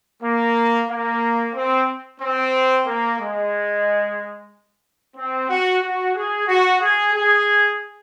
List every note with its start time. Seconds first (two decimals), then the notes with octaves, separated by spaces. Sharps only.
0.23 A#3
0.89 A#3
1.55 C4
2.21 C4
2.87 A#3
3.20 G#3
5.17 C4
5.49 F#4
5.83 F#4
6.16 G#4
6.48 F#4
6.82 G#4
7.14 G#4